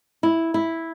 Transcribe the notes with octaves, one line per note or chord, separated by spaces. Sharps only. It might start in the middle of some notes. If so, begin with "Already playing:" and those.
E4
E4